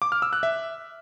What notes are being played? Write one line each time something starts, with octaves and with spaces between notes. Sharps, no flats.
D6
F6
E6
F#6
E5